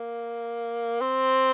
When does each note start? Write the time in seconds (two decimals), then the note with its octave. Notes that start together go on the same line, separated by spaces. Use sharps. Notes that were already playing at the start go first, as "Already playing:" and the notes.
Already playing: A#3
1.01 C4